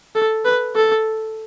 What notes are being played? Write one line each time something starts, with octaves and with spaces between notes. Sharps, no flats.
A4
B4
A4